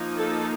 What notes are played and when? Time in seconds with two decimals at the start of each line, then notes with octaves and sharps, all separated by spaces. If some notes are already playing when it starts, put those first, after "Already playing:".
Already playing: F3 A#3 D#4
0.16 A4